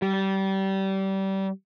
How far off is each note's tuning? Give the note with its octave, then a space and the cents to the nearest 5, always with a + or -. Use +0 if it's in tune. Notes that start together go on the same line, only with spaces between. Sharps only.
G3 -25